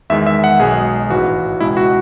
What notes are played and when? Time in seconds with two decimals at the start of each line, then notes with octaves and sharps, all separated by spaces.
0.10 E2 D#3 G#3 E5
0.27 E5
0.44 F#5
0.60 B1 B2 G#3 G#4
1.10 A1 G#2 E3 F#4
1.60 C#2 B2 G#3 E4
1.77 F#4